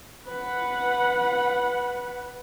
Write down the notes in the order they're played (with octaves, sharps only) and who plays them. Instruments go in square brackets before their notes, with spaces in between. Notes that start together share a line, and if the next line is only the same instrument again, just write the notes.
[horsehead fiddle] B4 F#5